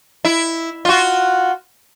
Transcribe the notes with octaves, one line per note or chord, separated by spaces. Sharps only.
E4
F4 F#4